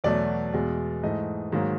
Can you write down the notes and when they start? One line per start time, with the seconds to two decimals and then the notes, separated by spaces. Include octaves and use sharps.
0.04 E2 B2 F#3 A3 D5
0.54 E2 B2 G#3
1.03 G#2 E3 A3 D#5
1.52 G#2 D#3 F#3 A#3